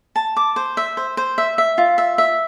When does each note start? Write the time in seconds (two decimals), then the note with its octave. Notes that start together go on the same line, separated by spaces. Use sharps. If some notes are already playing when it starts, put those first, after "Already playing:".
0.16 A5
0.36 D6
0.56 C5
0.77 E5
0.97 C5
1.17 C5
1.38 E5
1.58 E5
1.78 F4
1.98 E5
2.18 E5